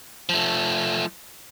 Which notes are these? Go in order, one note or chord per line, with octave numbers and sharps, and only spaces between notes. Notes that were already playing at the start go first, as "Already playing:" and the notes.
F3 A3